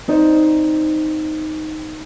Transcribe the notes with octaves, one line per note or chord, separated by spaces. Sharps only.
C4 D#4 C5 D5